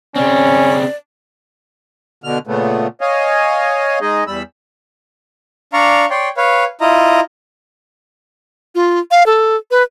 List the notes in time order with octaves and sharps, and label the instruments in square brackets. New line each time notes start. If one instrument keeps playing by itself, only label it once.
[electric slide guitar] C#3 C4 [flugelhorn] C#4 [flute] D5
[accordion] B2 D3 F6
A#2 C#3 A3 B3
C#5 D#5 F5 G#5
G#3 D#4 G#4 D#5
E2 G3 B5 E6
[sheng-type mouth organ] D4 D5 F5 A#5 C#6
C#5 D5 G5 C6
B4 C#5 F5
E4 F4 D#5 A#5
[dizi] F4
F5
A4
B4